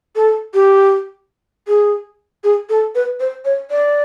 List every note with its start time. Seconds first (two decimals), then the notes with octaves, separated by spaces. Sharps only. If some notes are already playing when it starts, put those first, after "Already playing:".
0.16 A4
0.54 G4
1.68 G#4
2.44 G#4
2.69 A4
2.95 B4
3.20 C5
3.45 C#5
3.71 D5